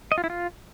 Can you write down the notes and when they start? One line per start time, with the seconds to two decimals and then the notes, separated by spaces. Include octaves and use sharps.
0.12 D#5
0.18 F4
0.24 E4
0.30 F4